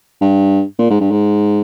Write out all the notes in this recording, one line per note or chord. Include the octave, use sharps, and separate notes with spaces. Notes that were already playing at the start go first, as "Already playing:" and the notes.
G2
A#2
G#2
G2
G#2